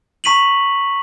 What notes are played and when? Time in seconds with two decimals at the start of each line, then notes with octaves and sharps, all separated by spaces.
0.24 A#5 C#6 B6 D#7 F7 F#7